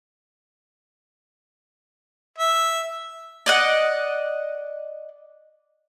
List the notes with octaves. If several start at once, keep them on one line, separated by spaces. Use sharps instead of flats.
E5
D5 D#5 F#5